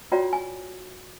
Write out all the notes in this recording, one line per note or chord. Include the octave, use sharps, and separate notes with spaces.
F4 F#4 C#5 D5 G5 A#5
G#5